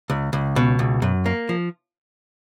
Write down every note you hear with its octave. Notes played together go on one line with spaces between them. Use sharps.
C#2
C#2
B2
C#2
F#2
A#3
F3